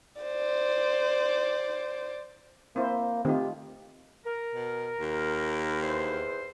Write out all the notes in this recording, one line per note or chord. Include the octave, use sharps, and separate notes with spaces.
C5 D5
A#3 C4 E4 C5
D#3 A3 C4 D#4 F4 G4
A#4
B2
D#2
E2 C5